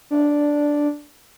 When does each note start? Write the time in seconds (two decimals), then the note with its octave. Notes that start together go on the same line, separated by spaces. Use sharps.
0.11 D4